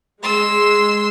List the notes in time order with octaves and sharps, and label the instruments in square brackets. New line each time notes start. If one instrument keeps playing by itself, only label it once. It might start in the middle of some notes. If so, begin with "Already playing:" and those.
[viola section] G#3 [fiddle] C6 E6